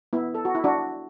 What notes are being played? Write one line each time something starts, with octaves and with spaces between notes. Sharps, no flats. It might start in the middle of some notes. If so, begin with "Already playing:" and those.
B3 E4
A4
F#4
E4
D4 F#4